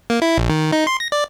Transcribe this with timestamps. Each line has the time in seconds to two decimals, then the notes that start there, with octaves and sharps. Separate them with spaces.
0.10 A#3
0.22 E4
0.38 A#1
0.49 D#3
0.72 D#4
0.87 C6
1.00 A#6
1.12 D5